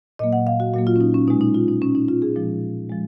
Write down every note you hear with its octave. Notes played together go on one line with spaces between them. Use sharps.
A#2 F#3 A#3 D#5
F#5
F5
F#4
A#2 F#3 A#3 F#4
F4
C#4
D#4
C#4
B2 G#3 D#4
D#4
F4
D#4
B2 G#3 C#4
D#4
F4
G#4
A#2 F3 G#3
F3 G#3